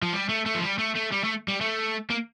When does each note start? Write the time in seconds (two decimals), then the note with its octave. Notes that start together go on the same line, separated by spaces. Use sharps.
0.02 F3
0.13 G3
0.29 A3
0.46 A3
0.55 F3
0.62 G3
0.78 A3
0.95 A3
1.12 G3
1.24 A3
1.48 G3
1.61 A3
2.10 A#3